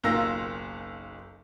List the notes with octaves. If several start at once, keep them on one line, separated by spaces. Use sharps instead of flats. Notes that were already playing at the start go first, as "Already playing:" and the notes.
F#1 B1 F4 A#4 E6 A#6